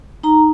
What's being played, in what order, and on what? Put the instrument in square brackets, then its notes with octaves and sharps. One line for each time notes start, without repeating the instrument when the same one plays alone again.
[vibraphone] D#4 A#5